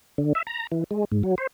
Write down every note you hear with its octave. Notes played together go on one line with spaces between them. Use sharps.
D3
E5
A#5
E3
G#3
G#2
F#3
C5